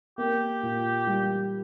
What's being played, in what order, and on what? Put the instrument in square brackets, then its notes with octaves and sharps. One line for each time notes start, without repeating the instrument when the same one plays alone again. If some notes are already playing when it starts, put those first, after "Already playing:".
[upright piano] A#3 [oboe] G4
[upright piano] A#2
G3